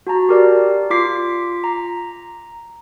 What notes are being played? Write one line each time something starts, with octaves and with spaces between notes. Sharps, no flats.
F#4 A5 A#5
G4 A#4 D5
F4 D6 B6 C7
A#5